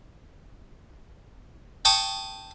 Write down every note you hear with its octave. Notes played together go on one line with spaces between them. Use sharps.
G5 A5 C#6 D#6